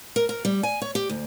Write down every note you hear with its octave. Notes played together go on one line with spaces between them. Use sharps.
A#4
A#4
G3
G#5
C#5
G4
D2